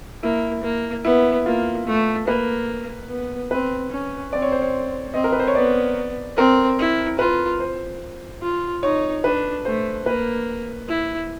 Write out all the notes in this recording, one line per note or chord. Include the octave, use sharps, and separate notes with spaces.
A#3 E4
A#3
B3 E4
A#3 F4
A3
A#3 B4
B3
C4 B4
C#4
C4 D5
C#5
C5
C#5
C4 D#5
A#4
B4
C5
C#5
B3 D5
C4 A#4
E4
F4 B4
C5
F4
D#4 C#5
D4 B4
A3 C5
A#3 B4
E4